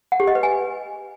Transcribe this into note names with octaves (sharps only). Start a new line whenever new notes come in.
F#5
G4
D#5
B4
G#5